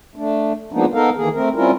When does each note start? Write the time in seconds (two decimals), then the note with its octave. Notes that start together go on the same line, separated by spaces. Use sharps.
0.16 A3 D4
0.72 F3 G#3 A#3 B3 D4 D#4
0.94 B3 D#4 A4 A#4 F5
1.17 D#3 E3 A#3 G#4
1.34 A3 C4 A#4
1.55 G3 C4 C#4 E4 F4 A#4